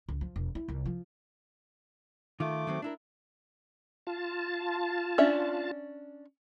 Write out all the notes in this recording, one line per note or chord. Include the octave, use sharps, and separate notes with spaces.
C#2
F3
E1
E4
C2
F3
D#3 A3 F4 D6
D#3 F#3 C4
D4 E4 A#4
F4 A5
C#4 D4 E5